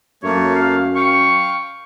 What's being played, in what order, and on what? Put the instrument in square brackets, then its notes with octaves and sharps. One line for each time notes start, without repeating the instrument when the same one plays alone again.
[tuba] F#2 [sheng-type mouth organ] A3 A#3 [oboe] C#5
[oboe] F5
[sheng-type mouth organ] F5 G5 [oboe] C#6